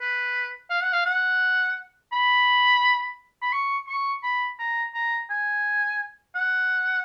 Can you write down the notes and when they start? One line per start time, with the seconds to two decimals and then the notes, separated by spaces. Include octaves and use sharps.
0.01 B4
0.70 F5
0.82 F#5
0.92 F5
1.05 F#5
2.12 B5
3.42 B5
3.53 C#6
3.88 C#6
4.23 B5
4.59 A#5
4.94 A#5
5.30 G#5
6.35 F#5